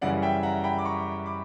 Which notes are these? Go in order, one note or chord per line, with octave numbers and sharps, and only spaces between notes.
F#2 C#3 E3 G3 C#4 D5 F#5
E5 G5
F#5 A#5
G5 B5
D6
A#5 C#6
B5 D6